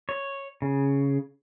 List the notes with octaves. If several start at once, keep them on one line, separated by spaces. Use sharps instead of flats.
C#5
C#3